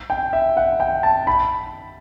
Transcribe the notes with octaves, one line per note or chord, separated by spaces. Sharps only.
G5
E5
F#5
G5
A5
B5